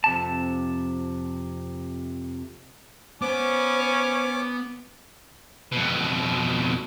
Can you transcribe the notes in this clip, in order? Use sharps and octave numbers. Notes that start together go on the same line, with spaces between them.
F2 C3 A5
B3 C#4 C5 D6
F2 B2